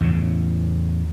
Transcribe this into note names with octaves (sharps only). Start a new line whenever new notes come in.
E2 A2 C#3